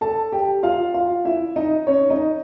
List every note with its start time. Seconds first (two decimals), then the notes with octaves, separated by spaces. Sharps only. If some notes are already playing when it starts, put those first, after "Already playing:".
0.01 A4 A5
0.32 G4 G5
0.63 F4 F5
0.94 F4 F5
1.25 E4 E5
1.56 D#4 D#5
1.87 C#4 C#5
2.10 D#4 D#5